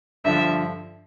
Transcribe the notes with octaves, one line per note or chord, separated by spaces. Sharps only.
G2 D3 F3 E5